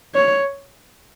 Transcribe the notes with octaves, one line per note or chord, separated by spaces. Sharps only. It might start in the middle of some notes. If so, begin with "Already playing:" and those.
C#5